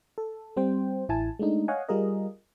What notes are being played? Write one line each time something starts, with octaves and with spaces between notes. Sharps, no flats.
A4
G3 C4 C5 G5
A1 E4 G#5 A5
G#3 A3 D4 D#4
C#5 D#5 F5 F#5 G#5
G3 F4 G#4 A#4 D#5